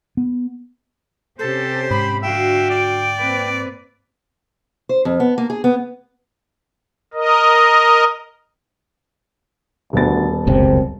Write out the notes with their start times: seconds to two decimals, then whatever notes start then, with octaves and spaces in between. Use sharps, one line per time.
0.17 B3
1.39 C3 C#4 G4 A4 C5
1.91 G#2 B5
2.22 D3 F#4 E5 F5 G5
2.70 D5
3.19 A#3 C4 B4
4.89 C5
5.05 F2
5.20 B3
5.38 A#3
5.50 G#4
5.64 B3
7.14 A#4 D#5
9.93 D#1 D2 B3 A6
10.47 F#1 C#2 C3 C4